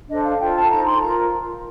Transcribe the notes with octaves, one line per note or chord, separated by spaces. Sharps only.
D4 A4 C5 D#5
F5
F4 A4 C5 G5
A5
D#4 A4 C5 A#5
C6
F4 A#4 A#5